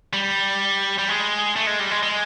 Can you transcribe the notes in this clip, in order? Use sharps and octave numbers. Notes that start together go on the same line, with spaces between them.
G3
G3
G#3
A3
G#3
G3
G#3
G#3